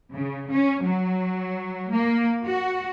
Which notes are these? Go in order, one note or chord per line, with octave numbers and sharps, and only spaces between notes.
C#3
C#4
F#3
A#3
F#4